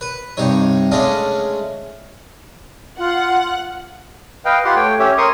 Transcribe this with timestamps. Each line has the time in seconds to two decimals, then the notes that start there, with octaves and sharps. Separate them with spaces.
0.01 B4
0.37 G2 C3 D#4 C#5
0.92 G#3 A3 C#4 D4 D#5 F5
2.98 F4 F#5
4.45 B4 D#5 F5 G5
4.65 F4 G4 B4 F#5 C6
4.76 A3 C#5 G5
4.99 C#4 G4 C#5 E5
5.18 A#4 C#5 C6 C#6 D#6